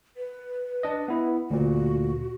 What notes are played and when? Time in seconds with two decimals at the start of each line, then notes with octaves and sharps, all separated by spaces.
0.17 B4
0.83 D4 D#5
1.08 B3 E4
1.50 D2 A#2 F#4